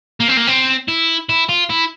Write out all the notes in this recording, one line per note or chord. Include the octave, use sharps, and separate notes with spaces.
A#3
C4
A#3
C4
E4
E4
F4
E4